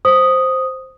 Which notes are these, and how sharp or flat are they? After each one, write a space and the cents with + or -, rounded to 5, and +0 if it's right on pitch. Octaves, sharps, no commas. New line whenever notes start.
C5 +0 D#6 +0